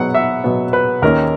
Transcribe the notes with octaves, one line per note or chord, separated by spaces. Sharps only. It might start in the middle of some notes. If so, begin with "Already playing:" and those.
Already playing: B2 F#3 B3 F#5
E5
B2 F#3 B3
B4
D#2 D#3 A#3 C#4 A#4